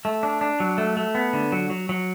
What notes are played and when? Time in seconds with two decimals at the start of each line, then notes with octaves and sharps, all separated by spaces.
0.05 A3
0.23 D4
0.41 D4
0.60 F#3
0.78 A3
0.97 A3
1.15 B3
1.33 D3
1.52 F#3
1.70 F#3
1.89 F#3